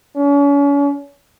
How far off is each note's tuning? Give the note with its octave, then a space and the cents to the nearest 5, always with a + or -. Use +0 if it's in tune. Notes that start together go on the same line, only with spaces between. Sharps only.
C#4 +40